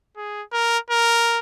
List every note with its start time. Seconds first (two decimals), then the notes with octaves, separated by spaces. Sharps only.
0.17 G#4
0.53 A#4
0.91 A#4